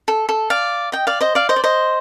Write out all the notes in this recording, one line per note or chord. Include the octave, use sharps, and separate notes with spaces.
A4
A4
D5 F5
D#5 G5
D5 F5
C5 D#5
D5 F5
C5 D#5
D5
C5 D#5